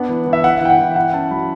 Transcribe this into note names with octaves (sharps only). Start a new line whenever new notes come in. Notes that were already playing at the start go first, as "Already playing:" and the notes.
Already playing: B3 D4 F#5
E3
E3
E5
E4 F#5
E3 G5
F#5
E3
E4 F#5
C#4 A5
F#3 B5